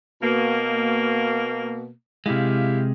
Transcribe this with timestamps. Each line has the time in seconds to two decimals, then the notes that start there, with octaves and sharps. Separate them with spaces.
0.22 B2 A#3
2.26 C3 G#3 E4 G4 F5